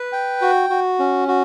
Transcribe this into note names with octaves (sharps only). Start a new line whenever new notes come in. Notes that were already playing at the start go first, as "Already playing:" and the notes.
Already playing: B4
G5
F#4
F#4
C#4
F#4